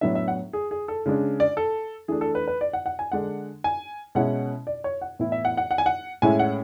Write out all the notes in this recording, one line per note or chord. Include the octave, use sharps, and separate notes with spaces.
A2 F#3 B3 D4 E5
E5
F#5
G#4
G#4
A4
C#3 G#3 D4
D5
A4
E3 A3 D4 G#4
A4
B4
B4
D5
F#5
F#5
G#5
D3 G#3 D4 F#5
G#5
B2 G#3 C#4 E4 F#5
D5
C#5
F#5
A2 E3 B3 E4
E5
F#5
F#5
F#5
G#5
F#5
A2 G#3 C#4 E4 G#5
F#5